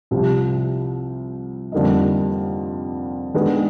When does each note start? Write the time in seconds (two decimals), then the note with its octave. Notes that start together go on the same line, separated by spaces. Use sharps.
0.11 C2 C3 F3
1.72 F2 D3 G3 A#3 D#4
3.34 D#3 G#3 B3 D4